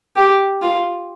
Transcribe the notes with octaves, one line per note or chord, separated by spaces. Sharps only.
G4
F4